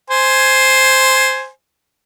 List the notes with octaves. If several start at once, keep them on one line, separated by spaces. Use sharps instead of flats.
C5 G#5